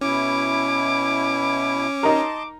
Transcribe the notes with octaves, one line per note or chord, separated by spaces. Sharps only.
B2 C#4 E4 D6
D#4 A#4 D#5 A5 C6